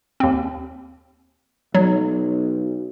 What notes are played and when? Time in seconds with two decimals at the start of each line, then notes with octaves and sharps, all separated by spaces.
0.20 D#2 C4
1.75 B1 F#3